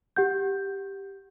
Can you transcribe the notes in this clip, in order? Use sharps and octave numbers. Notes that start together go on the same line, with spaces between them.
G4 F#5 G6